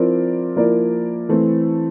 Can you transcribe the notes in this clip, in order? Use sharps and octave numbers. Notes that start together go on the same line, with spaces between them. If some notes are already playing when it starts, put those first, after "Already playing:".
Already playing: F3 C4 E4 A#4 D5
F3 A#3 E4 A#4 D5
E3 A3 C4